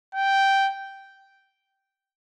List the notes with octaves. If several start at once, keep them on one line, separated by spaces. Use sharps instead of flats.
G5